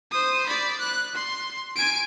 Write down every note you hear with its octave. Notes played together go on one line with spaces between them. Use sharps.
C5 D#6
D5 B5
F#6
C6
G#5 D7